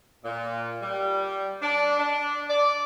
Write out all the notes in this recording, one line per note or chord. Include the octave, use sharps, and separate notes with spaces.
A#2
G3
D4
D4
D5